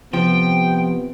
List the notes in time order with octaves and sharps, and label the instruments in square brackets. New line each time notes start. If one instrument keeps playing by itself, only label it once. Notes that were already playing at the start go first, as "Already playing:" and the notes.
[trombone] C3 [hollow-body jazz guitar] F3 [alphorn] B3 [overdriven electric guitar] G5